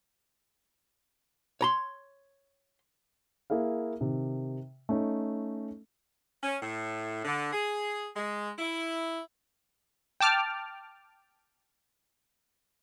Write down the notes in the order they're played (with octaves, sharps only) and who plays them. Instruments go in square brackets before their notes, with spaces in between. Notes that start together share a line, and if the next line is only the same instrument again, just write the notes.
[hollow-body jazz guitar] C#5 A#5 C6
[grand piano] A#3 E4 G#4 F5
C3 D#3
A3 C#4 D#4
[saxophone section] C#4
A2
D3
G#4
G#3
E4
[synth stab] G5 A5 D6 F6